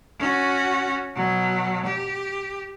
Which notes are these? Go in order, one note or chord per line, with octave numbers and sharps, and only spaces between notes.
C#4 F#4
B2 F#3
G4